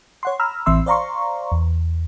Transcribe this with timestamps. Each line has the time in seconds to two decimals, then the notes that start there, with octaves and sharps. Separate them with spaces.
0.23 C#5 F#5 C6
0.40 A#5 B5 E6 F6
0.66 A1 E3 C4 E5 C6 E6
0.86 C5 D5 F5 A#5 C6 C#6
1.52 E2